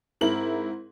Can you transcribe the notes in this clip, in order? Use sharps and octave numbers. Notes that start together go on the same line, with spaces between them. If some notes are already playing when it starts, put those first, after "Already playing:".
G#2 C4 E4 A#4 F#7